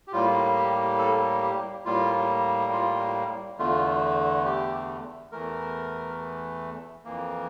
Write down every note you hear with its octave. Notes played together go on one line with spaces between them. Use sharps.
G4
A2 G3 A#3 F4
G4
A4
G4
A2 G3 A#3 F4
F4
E2 D3 A3 F4
G4
E2 E3 A3 A#4
F2 E3 A#3